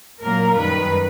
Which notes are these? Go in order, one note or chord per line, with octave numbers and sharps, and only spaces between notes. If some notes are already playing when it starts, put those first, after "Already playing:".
A#2 F#3 A#3 A#4
F#2 D#3 G3 B4